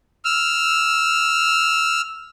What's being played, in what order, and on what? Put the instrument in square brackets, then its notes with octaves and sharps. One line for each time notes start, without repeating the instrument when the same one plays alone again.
[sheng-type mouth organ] E6 F6